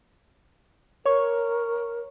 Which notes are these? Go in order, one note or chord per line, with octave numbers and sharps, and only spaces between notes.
A#4 C#5 C#6